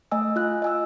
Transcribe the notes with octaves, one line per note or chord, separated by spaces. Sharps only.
A3 D#5 G#5 E6
F4 F#6
D#5 G#5 E6